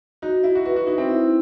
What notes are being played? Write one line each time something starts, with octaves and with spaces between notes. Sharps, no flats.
D#4 F#4
E4 E5
F#4
F#4 B4
F#4
D#4 E4
C4
E4